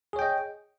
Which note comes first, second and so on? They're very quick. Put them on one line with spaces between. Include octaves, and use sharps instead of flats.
G#4 C#5 G5 D#5